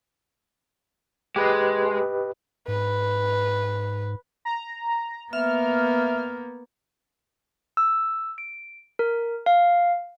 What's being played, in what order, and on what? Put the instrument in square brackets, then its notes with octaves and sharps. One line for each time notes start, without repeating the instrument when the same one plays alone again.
[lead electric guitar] G#3 [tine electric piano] G4 B4 D#5
[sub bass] G#2 [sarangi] B4
[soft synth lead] A#5
[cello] A#3 B3 [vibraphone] E5 [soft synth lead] F6
[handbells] E6
D7
A#4
F5